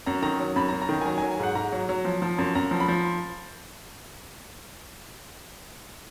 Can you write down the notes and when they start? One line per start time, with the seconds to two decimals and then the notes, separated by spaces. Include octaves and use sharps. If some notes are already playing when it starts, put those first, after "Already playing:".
0.06 F#2 A#5
0.22 D#3 A#5
0.40 F#3 A#5
0.56 F#2 B5
0.69 F#2 A#5
0.82 A#5
0.89 D#3
0.94 A#5
1.01 G#5
1.06 F#3 A#5
1.18 F#3 G#5
1.31 G#5
1.39 G#2 F#5
1.55 G#2 A#5
1.72 F#3
1.89 F#3
2.05 F3
2.22 F3
2.38 F#2
2.55 F#2 A#5
2.71 F3
2.80 B5
2.88 F3